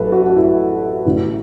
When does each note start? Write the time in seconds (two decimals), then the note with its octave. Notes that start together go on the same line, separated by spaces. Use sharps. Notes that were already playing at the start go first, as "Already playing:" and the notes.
Already playing: A1 A2 F#3 A4 B4
0.12 F#4
0.26 F#4
0.36 E4
1.05 A1 A2 E3